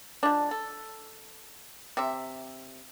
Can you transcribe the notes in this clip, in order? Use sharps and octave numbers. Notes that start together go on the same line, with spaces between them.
F3 G#3 D4
A4
C3 E5